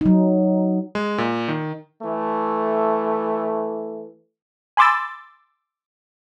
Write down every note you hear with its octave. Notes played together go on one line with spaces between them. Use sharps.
F#3 D#4
G#3
A#2
D#3
E3 A3
G#5 B5 C6 D6 E6 A6